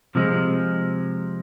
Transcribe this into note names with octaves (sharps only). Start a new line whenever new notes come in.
C3 F3 G#3